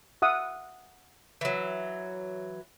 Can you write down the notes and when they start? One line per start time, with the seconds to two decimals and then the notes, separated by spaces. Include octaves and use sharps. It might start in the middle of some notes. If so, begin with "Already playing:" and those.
0.22 E5 F#5 D#6
1.41 E3 F#3